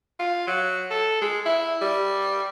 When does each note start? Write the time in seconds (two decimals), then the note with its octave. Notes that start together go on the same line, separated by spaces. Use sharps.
0.19 F4
0.47 F#3
0.91 A4
1.21 G#3
1.45 E4
1.81 G3